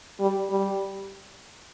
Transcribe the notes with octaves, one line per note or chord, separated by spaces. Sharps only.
G3
G3